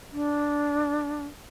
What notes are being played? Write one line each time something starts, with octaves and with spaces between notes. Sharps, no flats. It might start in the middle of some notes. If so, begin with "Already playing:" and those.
D4